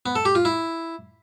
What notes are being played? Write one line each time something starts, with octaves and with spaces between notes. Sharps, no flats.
B3
A4
G4
F4
E4